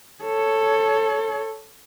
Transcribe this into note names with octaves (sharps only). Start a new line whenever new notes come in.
A4 C#5